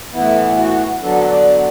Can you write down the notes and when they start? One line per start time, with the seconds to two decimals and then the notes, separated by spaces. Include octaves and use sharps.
0.13 A2 E3 B3 E4
0.57 F#4
1.02 D3 F#3 B3 D4 A4
1.31 D5